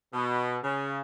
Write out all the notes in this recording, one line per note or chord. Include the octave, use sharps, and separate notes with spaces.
B2
C#3